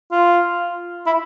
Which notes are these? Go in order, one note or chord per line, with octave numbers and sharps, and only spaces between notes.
F4
E4